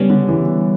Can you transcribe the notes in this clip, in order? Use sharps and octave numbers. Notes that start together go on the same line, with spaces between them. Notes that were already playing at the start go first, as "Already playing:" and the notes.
Already playing: C#3 G3 B3 C#4 D4
D3
E3